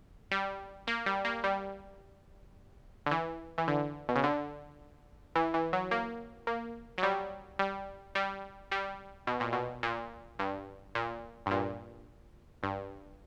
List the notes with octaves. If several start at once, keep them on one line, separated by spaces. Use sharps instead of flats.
G3
A#3
G3
A#3
G3
D3
E3
E3
D3
B2
C#3
D3
E3
E3
F#3
A#3
A#3
F#3
G3
G3
G3
G3
B2
A#2
B2
A#2
G2
A#2
G2
A#2
G2